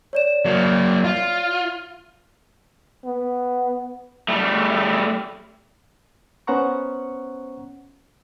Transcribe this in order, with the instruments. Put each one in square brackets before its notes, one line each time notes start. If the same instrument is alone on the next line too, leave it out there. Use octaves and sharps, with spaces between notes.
[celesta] C#5 D5 E7
[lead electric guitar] F#3 A#3
F4
[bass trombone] B3
[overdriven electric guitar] G3 A3
[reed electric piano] B3 C#4 C5 F#5 A#5 C#6